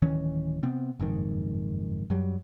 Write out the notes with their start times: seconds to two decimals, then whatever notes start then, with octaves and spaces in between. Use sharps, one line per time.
0.02 D1 D#3 E3 C#4
0.63 C3 B3 C4
1.00 F#1 F2 G#2 D#3
2.10 F#2 F#3 G3